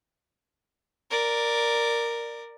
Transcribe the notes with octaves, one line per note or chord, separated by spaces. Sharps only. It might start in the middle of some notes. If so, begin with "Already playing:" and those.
A#4 D5